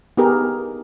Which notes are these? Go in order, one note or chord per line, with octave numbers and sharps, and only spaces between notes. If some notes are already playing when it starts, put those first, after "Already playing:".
B3 D#4 G4 G#4 A#4